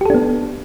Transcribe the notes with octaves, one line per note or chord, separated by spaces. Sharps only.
B3 D4 G4 A4